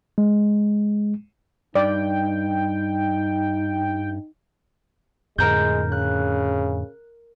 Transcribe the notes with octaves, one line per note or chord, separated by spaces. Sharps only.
G#3
G2 D#4 D5 G5
F2 A2 D3 G#3 A#4 A#5 G6
C#3 F#6